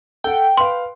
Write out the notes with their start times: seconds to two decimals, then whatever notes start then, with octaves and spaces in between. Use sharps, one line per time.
0.24 A4 F#5 G5
0.57 B4 F5 C6